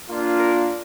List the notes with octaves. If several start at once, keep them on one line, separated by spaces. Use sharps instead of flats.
A#3 D4 F4
A#4